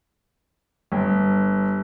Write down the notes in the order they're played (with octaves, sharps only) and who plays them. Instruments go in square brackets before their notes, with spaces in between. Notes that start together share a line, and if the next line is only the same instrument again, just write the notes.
[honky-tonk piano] G1